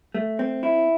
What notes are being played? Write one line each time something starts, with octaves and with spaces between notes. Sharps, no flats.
A3
C4
E4